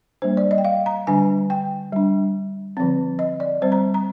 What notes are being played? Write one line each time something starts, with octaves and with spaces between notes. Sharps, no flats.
G3 A#3 D4 C5
D5
D#5
G5
F5
A#5
D3 G3 D4 G#5
G5
G3 D4
D3 F3 C4
D#5
D5
G3 C4 C5
A#5
A#5